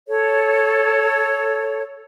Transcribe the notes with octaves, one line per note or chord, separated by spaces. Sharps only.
A4 C#5